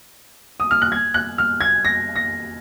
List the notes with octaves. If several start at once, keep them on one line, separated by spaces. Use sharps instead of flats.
D#6
F6
F#6
G#6
F#6
F6
G#6
A#6
A#6